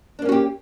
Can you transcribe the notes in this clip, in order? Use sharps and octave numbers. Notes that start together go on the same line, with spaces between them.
A#3 C#4 D4 F#4 G4